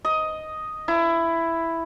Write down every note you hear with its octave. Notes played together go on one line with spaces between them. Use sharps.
D#5
E4